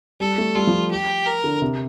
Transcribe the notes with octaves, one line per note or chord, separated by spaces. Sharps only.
G3 A4
A3
G3 F4
F3
G4
A#4
D3
C3